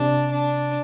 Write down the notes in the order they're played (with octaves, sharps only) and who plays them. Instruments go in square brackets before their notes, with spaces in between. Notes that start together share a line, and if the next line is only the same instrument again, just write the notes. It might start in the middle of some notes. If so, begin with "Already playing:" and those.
Already playing: [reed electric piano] C3 [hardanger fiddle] D4
[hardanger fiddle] D4